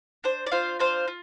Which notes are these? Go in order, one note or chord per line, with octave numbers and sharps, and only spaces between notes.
D4 C5
D5
F4 C5 F5
D4 C5 F5
F4